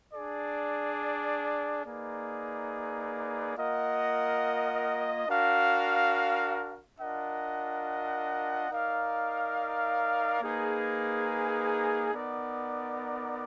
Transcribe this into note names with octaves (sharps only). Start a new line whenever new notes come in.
D4 G#4 D5
A#3 D#4 G#4 B4 D5
A#3 F4 A#4 D#5 F#5
D4 F#4 A#4 F5
D4 F4 A#4 D#5 F#5
D#4 A#4 D5 F5
A#3 D#4 G#4 B4
B3 D#4 A#4 D5 F#5